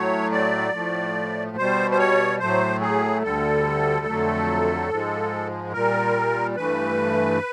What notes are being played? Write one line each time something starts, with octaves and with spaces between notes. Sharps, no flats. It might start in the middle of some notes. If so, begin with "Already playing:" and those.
Already playing: A2 F#3 A3 C#5
D5
A2 F3 A3
B2 G3 C5
C5
C#5
A2 F#3 A3 C5
G#4
D2 D3 G3 A4
F2 D3 F#3 A3
G#2 F3 G#3
A#2 G3 A#4
G2 E3 A3 B4